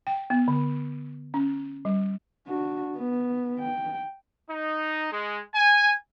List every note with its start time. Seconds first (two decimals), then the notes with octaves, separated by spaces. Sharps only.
0.07 G5
0.30 B3
0.48 D3
1.34 C#4
1.85 G3
2.48 D4 F#4
2.96 B3
3.59 G5
4.49 D#4
5.12 G#3
5.54 G#5